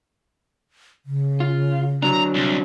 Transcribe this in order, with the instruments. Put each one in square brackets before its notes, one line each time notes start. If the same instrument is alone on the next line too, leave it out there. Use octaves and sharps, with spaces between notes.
[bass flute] C#3
[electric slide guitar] F4
[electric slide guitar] D3 F#3 D4 [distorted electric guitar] A#5
[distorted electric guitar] C2